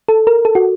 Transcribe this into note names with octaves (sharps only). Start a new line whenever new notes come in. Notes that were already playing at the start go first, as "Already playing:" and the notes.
A4
A#4
A4
F#4